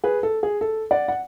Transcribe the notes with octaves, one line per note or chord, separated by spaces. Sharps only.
G#4 B4
A4
G#4
A4
D5 F#5
F#5